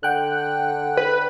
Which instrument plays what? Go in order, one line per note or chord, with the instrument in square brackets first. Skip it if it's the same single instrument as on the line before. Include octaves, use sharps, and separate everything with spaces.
[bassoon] D3 [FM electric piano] F#5 G5 F#6
[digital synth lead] B4